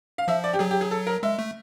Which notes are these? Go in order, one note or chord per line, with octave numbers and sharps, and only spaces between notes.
F5
F3 E5
D5
G4
F#3 G#4
G4
G#4
A4
A#4
G#3 E5
A3